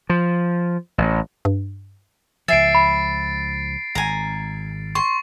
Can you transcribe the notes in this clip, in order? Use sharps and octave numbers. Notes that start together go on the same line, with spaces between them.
F3
A1
G2
C#2 F3 E5 G#5 A6 C7 D7
B5
G#1 G#5 A#5
C6 C#6